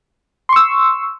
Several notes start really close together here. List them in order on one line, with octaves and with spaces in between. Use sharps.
C6 C#6 E6